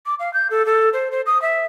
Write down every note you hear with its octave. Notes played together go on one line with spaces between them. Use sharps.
D6
F5
G6
A4
A4
C5
C5
D#6
E5